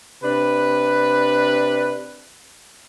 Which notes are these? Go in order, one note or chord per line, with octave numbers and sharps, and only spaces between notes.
C3 D4 B4